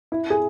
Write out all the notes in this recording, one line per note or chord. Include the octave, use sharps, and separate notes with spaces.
E4
G#4